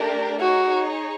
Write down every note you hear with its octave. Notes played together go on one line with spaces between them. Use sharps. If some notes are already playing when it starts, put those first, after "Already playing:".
Already playing: A3 D4 G4 A#4
D#4 F#4 G#4 C#5